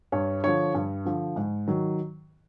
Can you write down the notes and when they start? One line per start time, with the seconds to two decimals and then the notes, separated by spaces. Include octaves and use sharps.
0.12 G2 C#5
0.44 D3 F3 C#5
0.75 G2
1.05 D3 F3
1.36 G#2
1.67 D#3 F#3